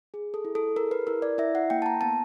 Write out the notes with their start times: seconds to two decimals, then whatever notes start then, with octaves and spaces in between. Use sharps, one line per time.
0.14 G#4
0.34 A4
0.45 E4
0.55 A4
0.76 G#4 A#4
0.91 B4
1.07 E4 A#4
1.22 D5
1.38 E4 E5
1.55 F#5
1.70 A#3 G5
1.82 A5
1.86 A#5
2.01 B3 A5